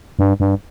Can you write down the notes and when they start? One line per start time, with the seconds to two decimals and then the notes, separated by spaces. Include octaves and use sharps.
0.19 G2
0.40 G2